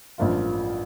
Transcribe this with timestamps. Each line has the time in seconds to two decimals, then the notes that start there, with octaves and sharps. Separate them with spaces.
0.18 A1 G2 F3 A#3 F4